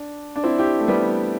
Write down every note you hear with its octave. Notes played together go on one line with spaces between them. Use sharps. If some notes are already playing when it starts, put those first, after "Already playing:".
Already playing: D4
D4
C4 E4
E4 G4
A3
G3 B3